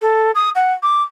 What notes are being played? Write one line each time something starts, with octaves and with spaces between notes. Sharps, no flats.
A4
D#6
F#5
D6